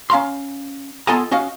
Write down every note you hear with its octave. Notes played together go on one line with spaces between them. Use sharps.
C#4 F5 A#5 C6
B3 F4 A4 D#5 G#5 A#5
C#4 F#4 D#5 F5